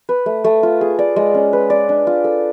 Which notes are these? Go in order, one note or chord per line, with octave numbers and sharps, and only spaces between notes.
B4
A3
A3
F4
G#4
D5
G#3
C#4
B4
D5
D4
F4
A4